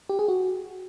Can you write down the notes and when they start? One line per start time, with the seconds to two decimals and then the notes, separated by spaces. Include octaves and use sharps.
0.09 G4
0.19 G#4
0.28 F#4